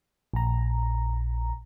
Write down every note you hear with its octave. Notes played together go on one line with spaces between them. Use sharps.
A#1 A#5